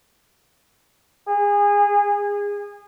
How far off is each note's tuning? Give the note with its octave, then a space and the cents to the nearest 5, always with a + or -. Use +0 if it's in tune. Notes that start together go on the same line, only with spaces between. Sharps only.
G#4 -25